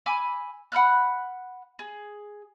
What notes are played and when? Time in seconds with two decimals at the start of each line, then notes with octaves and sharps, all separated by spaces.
0.06 G#5 B5 D6 E6
0.72 F#5 B5 F6 F#6
1.79 G#4